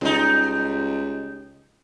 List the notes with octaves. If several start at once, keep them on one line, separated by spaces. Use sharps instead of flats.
C#2 G3 D#4